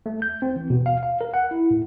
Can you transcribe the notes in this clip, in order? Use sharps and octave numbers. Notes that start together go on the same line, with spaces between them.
A3
G6
C4
E3
B2
F5
F5
A#4
F#5
E4
A2